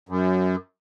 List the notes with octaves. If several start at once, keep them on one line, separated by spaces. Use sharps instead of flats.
F#2